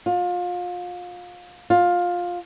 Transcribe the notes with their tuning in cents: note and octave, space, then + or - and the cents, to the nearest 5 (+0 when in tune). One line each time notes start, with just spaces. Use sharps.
F4 +30
F4 +15